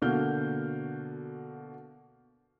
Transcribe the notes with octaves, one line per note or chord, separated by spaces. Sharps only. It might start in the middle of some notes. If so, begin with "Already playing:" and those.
B2 D3 A#3 F#4 F6 G6